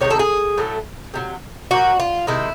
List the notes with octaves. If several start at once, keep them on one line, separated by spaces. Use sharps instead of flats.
C3 D#3 G#3 C#5
A4
G#4
A2 F#3 A3
C3 D#3 F#3
A#2 G3 A#3 F#4
F4
C3 D#3 G#3 E4